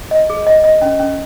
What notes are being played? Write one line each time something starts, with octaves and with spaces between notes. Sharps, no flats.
D#5
G#4
D#5
D#5
C#4
C#4